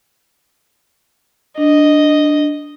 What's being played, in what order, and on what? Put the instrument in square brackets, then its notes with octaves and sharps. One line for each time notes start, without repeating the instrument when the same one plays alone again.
[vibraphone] D4 [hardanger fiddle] D#5